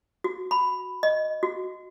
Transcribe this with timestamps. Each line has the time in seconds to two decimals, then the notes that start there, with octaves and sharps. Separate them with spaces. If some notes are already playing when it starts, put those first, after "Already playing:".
0.24 F#4
0.51 B5
1.03 D#5
1.43 F#4